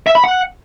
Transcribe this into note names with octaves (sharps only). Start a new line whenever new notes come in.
E5
B5
F#5